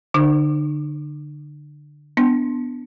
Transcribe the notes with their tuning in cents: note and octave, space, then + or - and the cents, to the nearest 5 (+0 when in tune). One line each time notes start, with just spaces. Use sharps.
D3 +0 D#4 -45 C5 +0
B3 +10 D4 +0